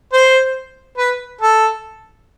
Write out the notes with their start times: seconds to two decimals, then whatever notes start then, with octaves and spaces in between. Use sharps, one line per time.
0.13 C5
0.98 B4
1.42 A4